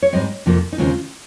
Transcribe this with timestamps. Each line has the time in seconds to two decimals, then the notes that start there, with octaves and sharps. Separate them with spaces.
0.02 C#5
0.13 G#2 G3 C4 D#5
0.46 F2 C3 F3 A#3
0.73 D#4
0.78 D#2 C#3 G#3 C4 F4